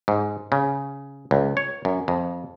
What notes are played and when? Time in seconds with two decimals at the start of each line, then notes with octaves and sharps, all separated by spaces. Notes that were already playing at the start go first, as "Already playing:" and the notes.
0.08 G#2
0.52 C#3
1.31 C#2
1.57 C#5
1.85 F#2
2.08 F2